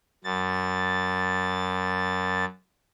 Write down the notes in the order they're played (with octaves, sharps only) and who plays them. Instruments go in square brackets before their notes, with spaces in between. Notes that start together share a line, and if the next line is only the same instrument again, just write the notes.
[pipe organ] F#2 A6